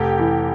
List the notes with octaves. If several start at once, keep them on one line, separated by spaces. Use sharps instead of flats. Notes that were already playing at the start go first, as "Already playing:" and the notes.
Already playing: F1 G4
E3